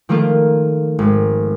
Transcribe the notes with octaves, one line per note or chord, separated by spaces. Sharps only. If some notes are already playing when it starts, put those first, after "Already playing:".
D#3 F3 A3 A#3 F4
G#1